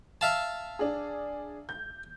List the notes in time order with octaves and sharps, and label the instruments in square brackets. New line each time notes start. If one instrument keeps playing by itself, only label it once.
[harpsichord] E5 F5 A5
[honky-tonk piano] D4 G#4
G6